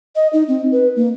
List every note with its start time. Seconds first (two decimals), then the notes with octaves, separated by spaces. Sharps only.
0.16 D#5
0.33 D#4
0.48 C4
0.72 B4
0.96 A#3